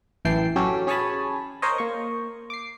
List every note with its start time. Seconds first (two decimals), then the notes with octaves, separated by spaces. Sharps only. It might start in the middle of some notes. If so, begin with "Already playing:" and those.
0.25 A1 F#2 E3 G5 A5 C7
0.56 F#3 C#4 G4 A4
0.87 C#4 G#4 C#5 G#5 A5 B5
1.62 A#4 C5 C#5 D#5
1.78 A#3 C#6
2.50 D6 C7